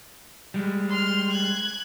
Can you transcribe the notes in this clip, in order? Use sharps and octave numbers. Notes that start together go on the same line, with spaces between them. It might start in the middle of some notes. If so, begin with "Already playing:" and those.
G3 G#3
C6 F6
F#6 G#6